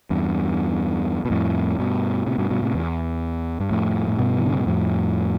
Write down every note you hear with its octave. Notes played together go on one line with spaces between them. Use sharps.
E2 G2
B2
F2 A2
G2 B2
A2 C3
G2 B2
G2 B2
A2 C3
E2
G2
F2 A2
A2
G2 B2
E3
D3
C3
B2
F2 A2